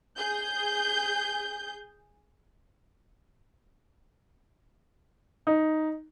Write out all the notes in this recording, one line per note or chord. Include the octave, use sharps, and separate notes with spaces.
G#4 G6
D#4